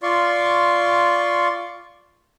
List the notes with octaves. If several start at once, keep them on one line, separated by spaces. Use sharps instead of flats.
F4 D5 C6 C#6